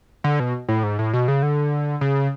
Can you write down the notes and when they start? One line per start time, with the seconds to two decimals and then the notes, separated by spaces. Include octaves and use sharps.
0.24 D3
0.40 B2
0.68 A2
0.83 G#2
0.99 A2
1.13 B2
1.28 C#3
1.43 D3
2.01 C#3